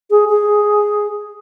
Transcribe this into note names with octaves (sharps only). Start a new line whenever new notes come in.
G#4
G#4